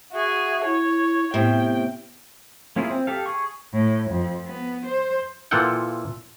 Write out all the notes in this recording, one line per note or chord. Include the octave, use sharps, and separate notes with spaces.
F#4 G#4 E5
E4 C#5
A2 C3 B3 G5
A#3 C#4 E4 F4 G#4
C4
G4 A4 F5
G#4 C#6
A2
F2
B3
C5
A#2 E3 F4 A4 F#5 G5